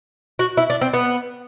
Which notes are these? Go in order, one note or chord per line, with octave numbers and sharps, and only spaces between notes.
F#4
E4
D4
C4
B3